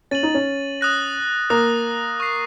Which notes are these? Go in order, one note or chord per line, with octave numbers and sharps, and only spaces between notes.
C#4 A6 D#7 F#7
D#4
C#4
D#6 F#6 A#6
A#3 D#6 F#6 A#6
C#6 F#6 C7